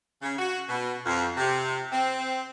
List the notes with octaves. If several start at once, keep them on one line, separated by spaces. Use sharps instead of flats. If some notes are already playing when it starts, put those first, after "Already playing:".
C#3
F#4
B2
F2
C3
C4